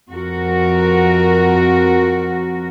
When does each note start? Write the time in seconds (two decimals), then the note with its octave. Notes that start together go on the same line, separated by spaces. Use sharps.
0.11 F2 F#4 A#4